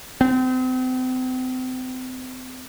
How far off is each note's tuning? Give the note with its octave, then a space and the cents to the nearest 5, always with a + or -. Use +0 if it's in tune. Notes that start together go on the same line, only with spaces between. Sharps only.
C4 -35